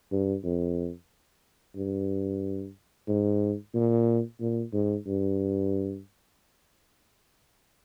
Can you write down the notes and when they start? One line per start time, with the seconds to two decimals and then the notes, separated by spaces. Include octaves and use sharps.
0.12 G2
0.44 F2
1.76 G2
3.08 G#2
3.74 A#2
4.40 A#2
4.73 G#2
5.07 G2